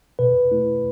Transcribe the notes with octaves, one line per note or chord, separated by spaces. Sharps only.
B2 B4
A3 E4